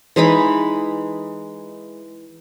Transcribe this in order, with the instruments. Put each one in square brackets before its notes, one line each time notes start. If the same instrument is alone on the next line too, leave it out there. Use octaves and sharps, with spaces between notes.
[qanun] E3 G#3 D#4 B5